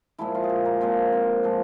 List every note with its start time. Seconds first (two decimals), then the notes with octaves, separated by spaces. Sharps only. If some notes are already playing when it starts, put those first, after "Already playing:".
0.18 A#2 F3 G#3 E4
0.35 F4
0.43 G#4
0.49 G4
0.65 A#3
0.81 A#2 F3 G#3 C4
1.13 C4
1.43 A#2 F3 G#3